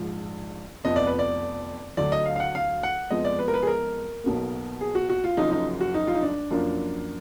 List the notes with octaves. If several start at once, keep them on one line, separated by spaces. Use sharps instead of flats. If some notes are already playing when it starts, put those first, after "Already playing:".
Already playing: A#1 G#2 F3
F1 F2 F3 B3 D#5
D5
B4
D5
D2 D3 F#3 D5
D#5
F5
F5
F#5
F5
F#5
F2 F3 G#3 B3 D#5
D5
B4
A#4
B4
G#4
A#4
B1 B2 A#3
G#4
F#4
F#4
F4
F#1 F#2 F3 D#4
D#4
F#4
D#4
F4
D#4
D4
F#2 F3 A#3 D4